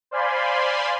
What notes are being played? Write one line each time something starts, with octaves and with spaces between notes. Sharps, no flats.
C5 D5 F5 G#5 B5 C6